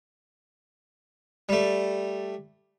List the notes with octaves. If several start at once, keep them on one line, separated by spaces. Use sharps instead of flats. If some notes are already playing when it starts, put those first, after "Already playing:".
G3 A3